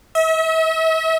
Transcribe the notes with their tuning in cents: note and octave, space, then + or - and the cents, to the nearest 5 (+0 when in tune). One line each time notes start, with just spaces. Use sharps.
E5 -40